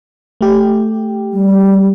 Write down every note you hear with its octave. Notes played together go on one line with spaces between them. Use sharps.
A3 G4
G3